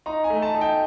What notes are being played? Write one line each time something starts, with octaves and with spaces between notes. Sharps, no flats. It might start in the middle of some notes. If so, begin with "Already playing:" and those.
D#4 A#5
G#5
A3
A5
D#4
G5